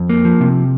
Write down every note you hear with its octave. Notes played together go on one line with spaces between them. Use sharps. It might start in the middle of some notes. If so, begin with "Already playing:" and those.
Already playing: F2
A#3
F3
C3